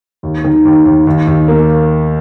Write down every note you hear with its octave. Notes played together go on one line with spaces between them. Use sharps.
D#2
D#3
D#2
D#2
D#2
D#2
A#3